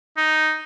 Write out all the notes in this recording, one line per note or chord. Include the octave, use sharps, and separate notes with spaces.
D#4